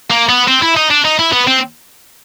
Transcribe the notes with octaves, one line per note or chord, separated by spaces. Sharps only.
A#3
B3
C4
E4
D#4
D4
D#4
E4
B3
C4